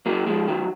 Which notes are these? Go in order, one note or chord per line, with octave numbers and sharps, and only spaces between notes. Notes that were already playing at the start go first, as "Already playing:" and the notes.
F#3 A#3
F3 G#3
D#3 F#3